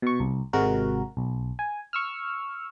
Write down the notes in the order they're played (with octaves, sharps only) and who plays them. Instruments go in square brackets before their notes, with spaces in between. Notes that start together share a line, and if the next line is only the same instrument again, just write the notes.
[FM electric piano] B2 C#6
C2
G#1 C3 G#3 F#4 A#4
B1
G#5
C#6 E6 F6